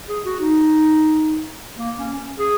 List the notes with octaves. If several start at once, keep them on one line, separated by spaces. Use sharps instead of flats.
G#4
F#4
D#4
A#3
C#4
G#4